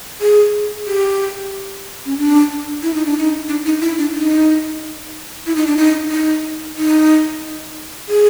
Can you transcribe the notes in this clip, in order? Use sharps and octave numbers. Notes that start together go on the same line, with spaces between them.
G#4
G4
C#4
D4
E4
D#4
D4
D#4
D4
D#4
E4
D4
D#4
E4
D#4
D4
D#4
D#4
D#4
G#4